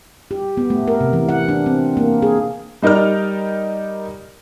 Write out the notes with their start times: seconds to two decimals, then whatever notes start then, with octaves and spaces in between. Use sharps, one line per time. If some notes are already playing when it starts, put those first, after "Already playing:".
0.31 G4
0.57 B3
0.70 A3
0.88 A#4
1.01 C3
1.13 E3
1.29 F#5
1.48 D4
1.66 C4
1.97 A#3
2.22 G#4
2.82 G3 D#4 A#4 D5 F6